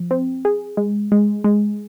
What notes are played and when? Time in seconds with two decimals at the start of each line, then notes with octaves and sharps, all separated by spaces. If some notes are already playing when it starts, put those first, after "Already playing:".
Already playing: F3
0.11 C4
0.45 G#4
0.77 G#3
1.12 G#3
1.44 G#3